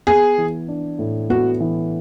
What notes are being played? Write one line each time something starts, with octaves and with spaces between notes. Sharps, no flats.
B3 G#4
E3
D4
A2
B3 F#4
E3